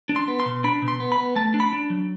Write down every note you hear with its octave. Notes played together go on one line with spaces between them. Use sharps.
D4
C6
B3
C6
B2
D4 B5
B2
C6
B3
B5
B3
A3 A5
D4
B5
D4
F#3